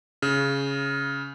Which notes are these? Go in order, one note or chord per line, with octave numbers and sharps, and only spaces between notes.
C#3